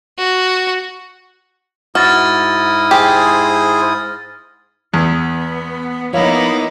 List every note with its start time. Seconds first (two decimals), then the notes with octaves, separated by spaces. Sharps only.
0.18 F#4
1.95 G#2 E4 F#4 D#6 F6 A6 A#6
2.91 G4 G#4 C5
4.94 E2 B3
6.13 F3 A#3 B3 D#4 E4 C#5 F5